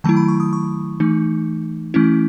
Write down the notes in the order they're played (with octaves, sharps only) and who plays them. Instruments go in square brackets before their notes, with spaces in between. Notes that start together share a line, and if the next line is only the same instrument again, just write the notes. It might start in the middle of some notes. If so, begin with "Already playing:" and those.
[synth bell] D#3 F#3 A3 E4 A5
B5
C#6
D#6
C#6
E3 A3 D#4
E3 A3 C#4 E4